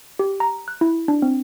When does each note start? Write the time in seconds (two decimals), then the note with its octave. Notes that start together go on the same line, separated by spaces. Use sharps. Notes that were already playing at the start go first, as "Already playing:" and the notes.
0.19 G4
0.40 A#5
0.68 F#6
0.81 E4
1.08 D4
1.22 C4